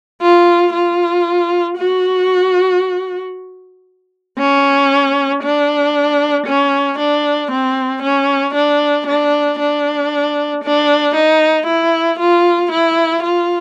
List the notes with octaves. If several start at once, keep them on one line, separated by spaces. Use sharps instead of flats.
F4
F4
F#4
C#4
D4
C#4
D4
C4
C#4
D4
D4
D4
D4
D#4
E4
F4
E4
F4